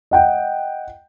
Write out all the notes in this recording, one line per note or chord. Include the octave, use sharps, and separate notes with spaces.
D#5 F#5 G5